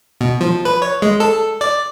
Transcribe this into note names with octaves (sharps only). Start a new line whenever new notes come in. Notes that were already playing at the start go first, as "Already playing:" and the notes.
B2
F3
B4
C#5
G#3
A4
D5